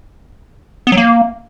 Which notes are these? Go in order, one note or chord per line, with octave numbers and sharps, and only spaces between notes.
B3
F#3
A#3